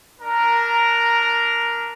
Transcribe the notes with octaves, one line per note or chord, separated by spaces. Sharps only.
D4 A#4 A#5